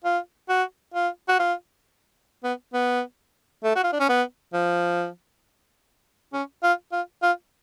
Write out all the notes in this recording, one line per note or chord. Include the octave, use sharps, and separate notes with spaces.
F4
F#4
F4
F#4
F4
B3
B3
A3
F#4
F4
D4
C#4
B3
F3
C#4
F4
F4
F4